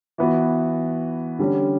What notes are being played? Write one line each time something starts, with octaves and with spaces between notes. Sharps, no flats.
E3 B3 F#4
D3 G3 C#4